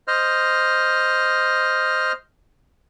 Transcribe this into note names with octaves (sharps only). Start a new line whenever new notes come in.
C5 D#5 F6